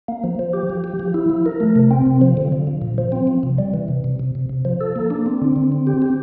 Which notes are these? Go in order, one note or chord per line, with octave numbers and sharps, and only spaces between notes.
A#3
F3
F3
G4
F3
G4
F3
E4
F3
A#4
A3
C3
C4
C3
F3
D3
F3
F3
A#2
F3
C4
F3
C3
G3
E3
C3
C3
C3
C3
C3
F3
A4
A#3
D4
C4
D3
D3
C4
G4
G4